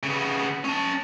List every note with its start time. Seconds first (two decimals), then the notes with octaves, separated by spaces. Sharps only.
0.03 C#3 B3
0.65 C#4 A5